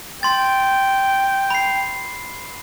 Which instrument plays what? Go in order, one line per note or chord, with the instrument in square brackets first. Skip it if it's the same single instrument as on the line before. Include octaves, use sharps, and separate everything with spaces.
[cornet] G5 [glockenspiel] C6 A6
[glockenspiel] B5 C7